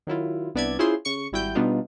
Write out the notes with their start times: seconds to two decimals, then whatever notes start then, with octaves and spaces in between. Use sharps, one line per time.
0.07 D#3 F#3 E4 F4
0.55 C2 B3 D4 D5 E5 G#6
0.79 C#4 E4 F4 G#4 C5 C6
1.05 C#3 C#6 C#7
1.32 G#1 G3 E4 F#4 G5 G6
1.55 B2 G3 B3 D4 D#4 F4